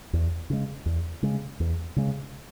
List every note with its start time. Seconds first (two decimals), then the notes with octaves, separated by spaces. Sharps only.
0.13 E2
0.50 C#3 G#3
0.86 E2
1.23 C#3 G#3
1.60 E2
1.96 C#3 G#3